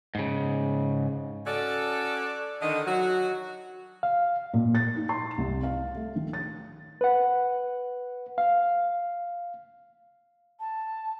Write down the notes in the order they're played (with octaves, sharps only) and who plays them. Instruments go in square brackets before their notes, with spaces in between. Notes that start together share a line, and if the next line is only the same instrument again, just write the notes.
[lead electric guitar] G#2 C#3
[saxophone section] C#4 F#4 A4 [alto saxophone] D5
[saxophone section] D3 D#3 [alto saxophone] D#5
[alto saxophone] F#3 [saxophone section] F#4
[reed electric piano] F5
[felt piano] A#2
A6
D#4
C6
C2
F5
A3
D#3
A6
[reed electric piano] B4 F#5
F5
[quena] A5